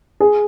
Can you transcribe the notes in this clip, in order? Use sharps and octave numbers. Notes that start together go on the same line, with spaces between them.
G#4